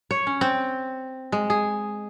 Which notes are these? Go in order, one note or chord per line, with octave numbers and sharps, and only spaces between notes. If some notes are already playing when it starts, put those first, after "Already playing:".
C#5
C#4
C4
G#3
G#4